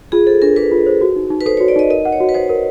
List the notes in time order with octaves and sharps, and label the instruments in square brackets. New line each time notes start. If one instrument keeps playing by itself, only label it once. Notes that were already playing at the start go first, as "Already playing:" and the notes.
[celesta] F4 [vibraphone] G#4
[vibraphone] A4 [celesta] C5
[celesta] D4 [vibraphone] A#4
[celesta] G#4 [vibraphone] B4
[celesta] F4
C5
F#4
D#4
D#4
[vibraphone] B4
[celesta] A4 [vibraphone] C5
[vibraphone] C#5
[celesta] F#4
[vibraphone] D5
[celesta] D#4 [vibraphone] D#5
[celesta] A#4 [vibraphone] D#5
[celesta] F#5
[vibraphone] C#5
[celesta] F#4
[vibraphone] B4
[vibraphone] C5 [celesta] D#5
[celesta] A#4